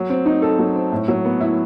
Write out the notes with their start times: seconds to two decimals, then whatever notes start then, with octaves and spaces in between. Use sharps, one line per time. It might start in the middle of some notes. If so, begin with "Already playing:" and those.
Already playing: F#3
0.10 C4
0.26 D#4
0.42 A4
0.59 F#3
0.75 C4
0.92 A2
1.08 F#3
1.25 B3
1.41 E4